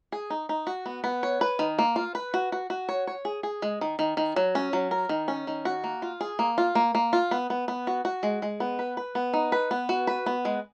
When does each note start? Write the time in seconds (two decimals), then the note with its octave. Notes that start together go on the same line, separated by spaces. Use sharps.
0.12 G#4
0.30 D#4
0.49 D#4
0.67 F#4
0.86 B3
1.04 B3
1.23 C#5
1.41 B4
1.59 D#3
1.79 A#3
1.96 F4
2.15 B4
2.34 F#4
2.52 F#4
2.70 F#4
2.89 C#5
3.07 C#5
3.25 G#4
3.43 G#4
3.62 G#3
3.81 D#3
3.99 D#3
4.17 D#3
4.36 F#3
4.55 C#4
4.73 F#3
4.91 A#4
5.09 D#3
5.28 C#4
5.47 D#3
5.65 F#4
5.84 A#3
6.02 F4
6.21 G#4
6.39 A#3
6.58 F4
6.75 A#3
6.95 A#3
7.13 F4
7.31 B3
7.50 B3
7.68 B3
7.87 F#4
8.05 F#4
8.23 G#3
8.42 G#3
8.60 B3
8.79 B4
8.97 B4
9.15 B3
9.33 D#4
9.52 B4
9.71 B3
9.89 F#4
10.07 B4
10.26 B3
10.45 G#3